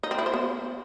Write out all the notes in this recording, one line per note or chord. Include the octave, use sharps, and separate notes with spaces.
D#4
C4
E4
C5
B3